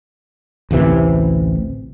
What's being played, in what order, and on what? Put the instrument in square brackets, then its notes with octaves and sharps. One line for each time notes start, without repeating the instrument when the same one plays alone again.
[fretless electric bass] A1 D2 C3 E3